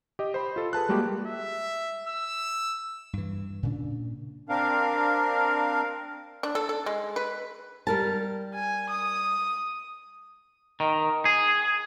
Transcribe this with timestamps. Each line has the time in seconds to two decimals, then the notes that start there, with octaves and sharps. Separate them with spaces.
0.19 G4 D#5
0.34 C5 B5
0.56 F4 A4
0.73 G#4 B4 A5 F#6
0.89 G3 G#3 A#3 F#4 G4
1.27 E5
2.07 E6
3.13 G2 E3
3.63 A#2 C#3 D4
4.49 C4 D4 A#4 F5
6.43 D4
6.55 A4
6.69 A4
6.86 G#3
7.16 B4
7.87 G3 A#4 A5
8.54 G#5
8.89 D#6
10.80 D#3
11.25 G#4